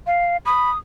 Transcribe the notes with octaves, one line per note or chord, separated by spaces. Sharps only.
F5
B5 D#6